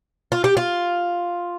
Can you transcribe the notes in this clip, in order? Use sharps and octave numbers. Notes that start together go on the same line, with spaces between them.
F4
G4
F4